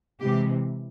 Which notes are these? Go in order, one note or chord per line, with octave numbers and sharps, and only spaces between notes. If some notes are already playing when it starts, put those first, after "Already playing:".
C3 E3 G#3 G4